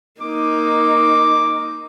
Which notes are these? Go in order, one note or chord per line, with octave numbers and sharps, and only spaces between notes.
A#3 D#4 D6